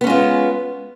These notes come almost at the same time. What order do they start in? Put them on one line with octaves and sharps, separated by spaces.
B3 C#4 G#3 F4